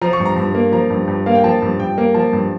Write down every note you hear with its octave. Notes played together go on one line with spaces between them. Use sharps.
F3 A#5
C#6
G2
A#5
G2
A#3
F3 A#5
G2
G2
A#3 F5
G5
F3 A5
G2
G2 G5
A#3
F3 A5
G2